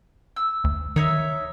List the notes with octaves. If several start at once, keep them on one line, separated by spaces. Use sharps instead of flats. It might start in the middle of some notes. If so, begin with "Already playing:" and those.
E6
D2
D#3 D#4 C#5 E5